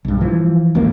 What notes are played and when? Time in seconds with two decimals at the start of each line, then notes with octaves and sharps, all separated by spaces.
0.05 B1 G2
0.21 E3 F3
0.75 D1 A1 D#2 A#3